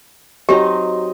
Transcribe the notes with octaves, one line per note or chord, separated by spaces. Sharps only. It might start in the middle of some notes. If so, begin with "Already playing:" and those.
F#3 C4 D#4 G4 D#5 C6